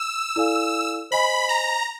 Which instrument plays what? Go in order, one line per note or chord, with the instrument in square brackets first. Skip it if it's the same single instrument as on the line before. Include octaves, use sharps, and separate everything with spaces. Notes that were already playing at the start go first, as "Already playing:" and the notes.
Already playing: [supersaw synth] E6
[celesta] E4 A4 D5 F5 G#5
[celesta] C5 D#5 G#5 [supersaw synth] B5
[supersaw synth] A#5